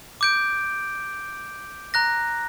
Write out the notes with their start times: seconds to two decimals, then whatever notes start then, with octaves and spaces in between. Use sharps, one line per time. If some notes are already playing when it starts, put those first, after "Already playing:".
0.21 D6 G6 D7
1.94 A#5 F#6 A#6